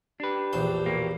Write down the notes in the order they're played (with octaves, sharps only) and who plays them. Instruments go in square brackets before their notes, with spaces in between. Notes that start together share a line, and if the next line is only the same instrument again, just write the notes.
[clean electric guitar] D4 B4 [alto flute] G4
[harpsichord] A#1 E2 C5
[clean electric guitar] B2 A#3